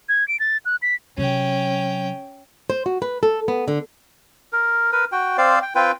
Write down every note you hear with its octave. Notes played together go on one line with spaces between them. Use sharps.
G#6
D7
A6
F#6
B6
C3 F#3 C#4 G5
C5
F#4
B4
A4
B3
D3
A#4
A#4 B4
F#4 G5
C4 C5 D5 F5
G5
C4 F4 B4 G5